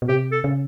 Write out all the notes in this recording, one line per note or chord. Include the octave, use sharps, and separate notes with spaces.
B2
C3 G4
A4
C#3